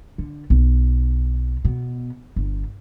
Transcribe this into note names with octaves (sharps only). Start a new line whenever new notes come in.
D3
B1
B2
G1